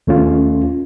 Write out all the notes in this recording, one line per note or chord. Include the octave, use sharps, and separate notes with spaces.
D#2 A3 C#4 F4